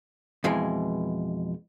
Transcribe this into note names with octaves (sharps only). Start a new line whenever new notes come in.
F2 B2 E3 G#3